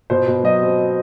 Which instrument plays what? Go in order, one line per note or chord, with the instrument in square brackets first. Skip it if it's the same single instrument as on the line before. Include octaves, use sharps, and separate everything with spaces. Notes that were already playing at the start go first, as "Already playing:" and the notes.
[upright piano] B2 C5
B2
F#3 D#5
C4
C4